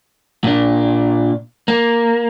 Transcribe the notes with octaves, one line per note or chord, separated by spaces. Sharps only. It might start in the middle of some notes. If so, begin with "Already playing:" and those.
A#2 D4
A#3